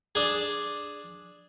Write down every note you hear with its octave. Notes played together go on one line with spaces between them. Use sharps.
D4 G#4